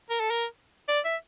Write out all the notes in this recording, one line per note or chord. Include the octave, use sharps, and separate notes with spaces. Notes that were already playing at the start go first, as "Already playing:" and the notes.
A#4
A4
A#4
D5
E5